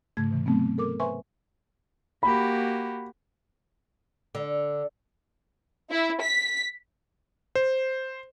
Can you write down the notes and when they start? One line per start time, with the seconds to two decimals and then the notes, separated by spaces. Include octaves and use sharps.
0.17 G#2 C#3 A3 G#6
0.31 C3 E3
0.46 F#3 A3 B3 C4
0.78 A4 A#4 D6
1.00 B4 C5 E5 G#5 C6 C#6
2.23 A#3 F#4 G4 B5
4.35 D3
5.91 E4
6.21 B6
7.55 C5